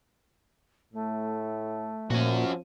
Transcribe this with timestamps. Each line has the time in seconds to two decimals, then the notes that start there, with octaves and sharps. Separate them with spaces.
0.93 A2 A3
2.10 A#2 F3 C#4 F#4